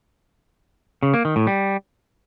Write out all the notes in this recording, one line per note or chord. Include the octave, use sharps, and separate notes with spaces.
C#3
A#3
D#3
A2
G3